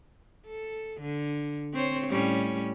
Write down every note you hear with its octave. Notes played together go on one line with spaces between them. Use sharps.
A4
D3
C4 C5 C#5
A2 G3 C#4